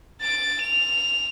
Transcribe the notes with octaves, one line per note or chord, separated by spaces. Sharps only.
A6 D7
F7